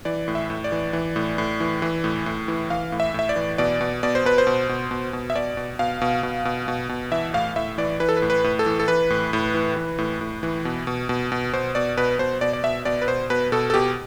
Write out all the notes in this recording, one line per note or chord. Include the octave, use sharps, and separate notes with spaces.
E3 D5
A2
E5
A2
D5
E3
E3
A2
A2
E3
E3
A2
A2
E3
E3 F5
A2
E5
A2 E5
D5
E3
B2 D5
B2
B2 D5
C5
B2 B4
C5
B2
B2
B2
B2
E5
B2 D5
B2
B2 F5
B2
B2
B2
B2
B2
E3 E5
A2 F5
A2 E5
E3 D5
E3 B4
A4
B4
A2
B4
A2
A4
E3
A4
E3 B4
A2
A2
E3
E3
A2
A2
E3
B2
B2
B2
B2
B2 C5
B2 D5
B2 B4
B2 C5
B2 D5
D5
B2 E5
B2 D5
B4
B2 C5
B2 B4
B2 A4
A4
B2 G4